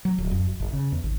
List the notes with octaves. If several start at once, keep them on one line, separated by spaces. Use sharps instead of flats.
F#3
D1
F#2
F#1
G1
C#3
E2
G#1